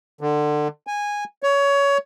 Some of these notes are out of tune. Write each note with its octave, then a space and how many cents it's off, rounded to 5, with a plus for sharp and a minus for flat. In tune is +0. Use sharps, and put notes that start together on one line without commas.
D3 +25
G#5 -10
C#5 +20